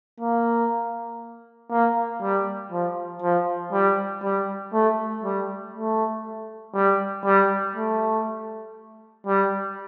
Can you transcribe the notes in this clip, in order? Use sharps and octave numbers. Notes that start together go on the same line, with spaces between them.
A#3
A#3
G3
F3
F3
G3
G3
A3
G3
A3
G3
G3
A3
G3